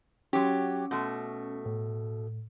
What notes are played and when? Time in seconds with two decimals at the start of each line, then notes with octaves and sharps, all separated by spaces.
0.33 F#3 C#4 G4
0.91 B2 A3
1.66 A2